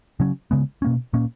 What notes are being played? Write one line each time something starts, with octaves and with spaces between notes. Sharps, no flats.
C#3 F#3 C#4
C#3 G#3 B3
B2 A#3 C#4
A#2 A#3 C#4